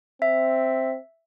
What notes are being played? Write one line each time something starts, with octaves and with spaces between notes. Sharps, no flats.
C4 E5